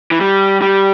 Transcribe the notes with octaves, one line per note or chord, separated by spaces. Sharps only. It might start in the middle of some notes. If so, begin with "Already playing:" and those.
E3
G3
G3